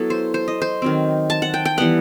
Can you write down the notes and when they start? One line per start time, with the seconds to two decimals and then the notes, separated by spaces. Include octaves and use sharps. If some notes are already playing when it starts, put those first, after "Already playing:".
Already playing: F#3 B3 E4 A4
0.10 C5
0.34 C5
0.48 D#5
0.62 C5
0.82 D#3 F#3 C4
1.30 A5
1.42 F#5
1.54 G5
1.65 G5
1.78 E3 G3 B3 F#5